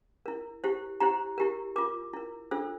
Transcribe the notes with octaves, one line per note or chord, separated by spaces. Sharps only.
E4 A#4
E4 G4 C5
E4 G4 C5 A#5
E4 G4 A#4
F4 A#4 D6
E4 A#4
D4 F4 A4 C5 E6